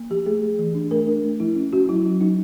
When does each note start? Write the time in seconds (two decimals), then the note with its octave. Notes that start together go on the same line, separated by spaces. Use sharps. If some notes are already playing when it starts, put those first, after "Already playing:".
Already playing: A#3
0.10 F3 G4
0.26 A3 G#4
0.42 A3
0.59 E3
0.75 D4
0.91 A3 A#4
1.07 D4
1.24 A3
1.40 F3 E4
1.55 C#4
1.73 C#4 F#4
1.88 F#3 E4
2.05 F#3
2.21 F#3 D#4